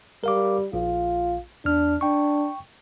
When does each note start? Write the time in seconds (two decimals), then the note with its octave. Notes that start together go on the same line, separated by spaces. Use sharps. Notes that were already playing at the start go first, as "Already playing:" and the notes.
0.24 G3 A#4 F5 D6
0.73 A#1 F4
1.65 E2 D4 F6
2.01 D4 G5 C#6